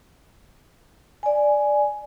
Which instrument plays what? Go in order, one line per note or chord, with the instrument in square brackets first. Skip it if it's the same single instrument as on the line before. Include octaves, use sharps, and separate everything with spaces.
[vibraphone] D5 G#5